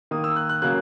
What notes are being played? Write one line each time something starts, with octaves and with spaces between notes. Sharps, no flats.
D#3 A#3 D#6
E6
F#6
F#6
C#3 F#3 A#3 F#6